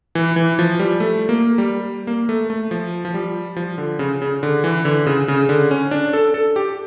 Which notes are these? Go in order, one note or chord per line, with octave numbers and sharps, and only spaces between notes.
E3
E3
F3
G3
A3
A#3
G3
A#3
A3
A3
F3
F3
G3
F3
D3
C#3
C#3
D3
E3
D3
C#3
C#3
D3
C#4
D4
A4
A4
G4